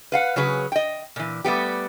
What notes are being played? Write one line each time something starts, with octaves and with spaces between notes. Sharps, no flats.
B4 F5 F#5
C#3 F#3 G#4 B4
D#5 G5
A#2 E3
G3 A3 B3 G4